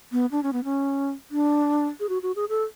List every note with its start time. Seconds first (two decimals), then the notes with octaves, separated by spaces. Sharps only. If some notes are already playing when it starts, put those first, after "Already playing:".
0.12 B3
0.32 D4
0.43 C#4
0.53 B3
0.64 C#4
1.31 D4
2.00 G#4
2.09 F#4
2.23 F#4
2.36 G#4
2.49 A4